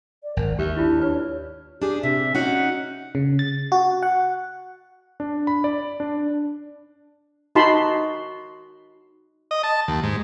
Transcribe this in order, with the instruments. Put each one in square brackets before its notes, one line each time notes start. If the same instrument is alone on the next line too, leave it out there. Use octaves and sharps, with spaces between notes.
[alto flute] D5
[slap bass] G#1 [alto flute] A#4
[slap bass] D#2 [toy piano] G4 [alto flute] E5
[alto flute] D4 [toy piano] E4 F4
[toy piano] B4 [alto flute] C#5
[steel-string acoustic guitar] D4 G#4 [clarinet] G4
[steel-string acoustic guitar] C3 [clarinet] E5
[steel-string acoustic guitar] C#4 D#4 F#4 [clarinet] F#5
[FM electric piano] C#3
A6
F#4
F#5
[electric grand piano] D4
B5
D5
D4
[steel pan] D#4 F#4 A5 B5 C6
[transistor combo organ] D#5
A5
D#2
G#2